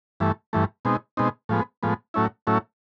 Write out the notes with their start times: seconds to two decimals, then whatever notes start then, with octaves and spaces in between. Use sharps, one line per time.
0.20 G2 E3 A3
0.53 G2 E3 A3
0.85 B2 G#3 C4 D#4
1.17 B2 G#3 C4 D#4
1.49 A2 F3 G#3 B3
1.83 A2 F3 G#3 B3
2.14 A2 F#3 A3 C#4 E4
2.47 A2 F#3 A3 C#4 E4